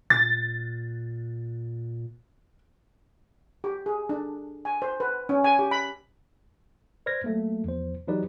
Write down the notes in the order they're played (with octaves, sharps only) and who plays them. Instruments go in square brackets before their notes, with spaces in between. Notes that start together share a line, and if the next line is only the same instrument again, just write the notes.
[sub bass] A#2 [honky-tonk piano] A6
[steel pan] G4
G#4
D4
G#5
C5
B4
C#4
G#5
G4
B5
[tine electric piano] B4 C5 D5 F6 G#6 A#6
F#3 A3 A#3
E2 F3 C5
E3 F#3 D#4 G4 B4 D5